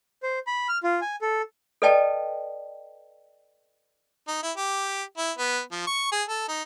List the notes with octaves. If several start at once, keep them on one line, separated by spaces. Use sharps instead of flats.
C5
B5
F6
F4
G#5
A4
A4 B4 D5 D#5 G5 A5
D#4
E4
G4
E4
B3
F3
C#6
G#4
A4
D#4